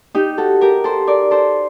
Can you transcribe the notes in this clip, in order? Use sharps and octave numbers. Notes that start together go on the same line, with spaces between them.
D#4 G4
F#4 A4
G4 A#4
A4 C5
A#4 D5
A4 C5